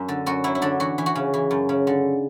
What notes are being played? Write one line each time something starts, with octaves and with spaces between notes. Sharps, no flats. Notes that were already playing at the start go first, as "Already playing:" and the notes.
Already playing: F#2
D3
F#2 F#4
F#3 E4
E4
D3 D4
E3 F#4
E3
F#4
C#3
E3
F#2
C#3
D3